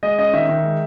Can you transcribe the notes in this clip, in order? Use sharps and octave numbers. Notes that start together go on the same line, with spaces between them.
G#3 D#5
C#4 D#5
D#3 E5
D#3
G#3